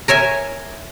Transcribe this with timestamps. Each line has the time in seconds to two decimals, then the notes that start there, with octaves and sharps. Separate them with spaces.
0.08 A#4 C#5 E5 G#5